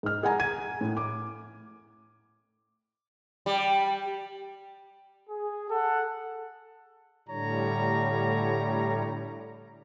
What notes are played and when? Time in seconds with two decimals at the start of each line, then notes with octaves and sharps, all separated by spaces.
0.03 G#2 F6
0.23 G#4 F#5 G#5 A#5
0.40 G#6 D#7
0.81 A2
0.97 D6
3.46 G3
5.30 G#4
5.70 A4 F#5
7.29 A2 D3 G3 C#5 A#5